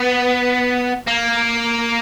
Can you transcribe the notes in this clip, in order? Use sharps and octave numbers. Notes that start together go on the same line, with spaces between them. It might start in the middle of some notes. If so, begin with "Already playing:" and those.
Already playing: B3
A#3